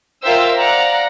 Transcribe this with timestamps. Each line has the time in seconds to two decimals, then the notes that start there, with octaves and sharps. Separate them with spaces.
0.22 F4 A#4 C5 E5 G5 E6
0.54 D5 F5 F#5 A#5